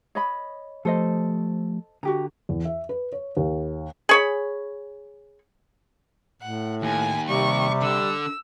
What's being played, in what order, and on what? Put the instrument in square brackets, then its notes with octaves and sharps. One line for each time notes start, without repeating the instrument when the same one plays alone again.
[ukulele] C#5 D#5 B5
[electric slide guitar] F3 A3 G4 [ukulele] A4 C5 D#5
[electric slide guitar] D3 [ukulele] F#4 G4 A#5
[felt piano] E2
E5
B4
C#5
D#2
[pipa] G#4 C#5 B5
[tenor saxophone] A2 [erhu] F#5
[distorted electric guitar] D#2 [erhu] G#5
[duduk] C3 [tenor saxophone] G3 [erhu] C#6
[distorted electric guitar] D3 [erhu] E6